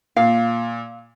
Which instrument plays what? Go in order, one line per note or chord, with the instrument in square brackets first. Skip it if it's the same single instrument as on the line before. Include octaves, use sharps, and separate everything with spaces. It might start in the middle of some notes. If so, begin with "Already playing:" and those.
[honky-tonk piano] A#2 [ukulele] F5